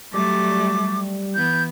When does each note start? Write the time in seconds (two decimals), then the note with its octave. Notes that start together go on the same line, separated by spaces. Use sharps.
0.14 F#3 G3 A3 D6
1.35 E3 B3 G6